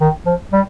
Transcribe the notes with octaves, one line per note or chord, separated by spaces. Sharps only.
D#3
F3
G3